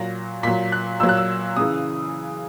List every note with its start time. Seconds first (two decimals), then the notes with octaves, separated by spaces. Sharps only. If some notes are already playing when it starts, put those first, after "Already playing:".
Already playing: A#2 F#3 A#6
0.43 A#2 F#3 B6
0.72 F#6
1.00 A#2 F#3 E6
1.09 F#6
1.17 E6
1.57 C#3 E3 D#6